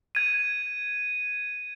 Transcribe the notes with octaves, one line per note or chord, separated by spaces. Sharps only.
G#6 D#7